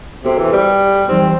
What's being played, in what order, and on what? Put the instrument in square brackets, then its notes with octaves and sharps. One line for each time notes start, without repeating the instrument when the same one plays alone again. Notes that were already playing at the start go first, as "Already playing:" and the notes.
[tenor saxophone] C3 [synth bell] B3 F#4 A4 C5
[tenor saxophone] E3
G3
[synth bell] E3 G3 D#4 G4 [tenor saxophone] C4